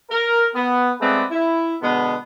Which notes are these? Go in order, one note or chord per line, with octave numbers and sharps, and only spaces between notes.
A#4
B3
G#3 A3 B3 C4 B4 D5
E4
B2 D3 G#3 B3